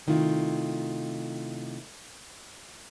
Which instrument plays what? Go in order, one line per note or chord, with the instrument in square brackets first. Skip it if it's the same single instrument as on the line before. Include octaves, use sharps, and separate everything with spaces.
[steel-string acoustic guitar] C3 D#3 A3 E4 F4